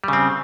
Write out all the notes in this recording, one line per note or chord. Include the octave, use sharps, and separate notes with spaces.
C#3 G3 C4